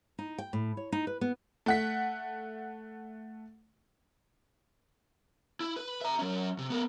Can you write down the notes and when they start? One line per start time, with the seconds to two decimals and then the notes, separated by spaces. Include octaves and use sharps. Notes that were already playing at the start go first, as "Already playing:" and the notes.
0.19 D#4
0.38 G5
0.53 A2
0.77 C#5
0.92 D#4
1.07 B4
1.21 B3
1.66 A3 F#5 B6
5.60 E4
5.76 B4
6.01 E5 A#5
6.19 F#3 C#4
6.58 C3
6.70 B3 A#4